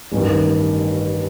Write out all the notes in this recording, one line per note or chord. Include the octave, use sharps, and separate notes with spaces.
A1 G2 D#3